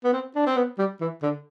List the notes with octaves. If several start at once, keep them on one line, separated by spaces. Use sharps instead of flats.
B3
C4
D4
C4
B3
G3
E3
D3